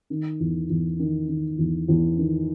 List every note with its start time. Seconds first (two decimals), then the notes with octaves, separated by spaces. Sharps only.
0.10 D#3
0.40 E2
0.70 E2
1.00 D#3
1.28 D#3
1.58 E2
1.88 E2
2.18 D#3